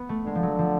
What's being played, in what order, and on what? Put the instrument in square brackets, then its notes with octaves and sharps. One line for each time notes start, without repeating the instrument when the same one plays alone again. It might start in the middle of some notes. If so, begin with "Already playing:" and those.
Already playing: [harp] B3
A3
[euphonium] D3 [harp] G#3
[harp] F3
F#3
F3